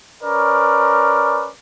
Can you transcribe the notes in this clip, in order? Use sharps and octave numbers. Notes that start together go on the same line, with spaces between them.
C#4 A#4 B4 D5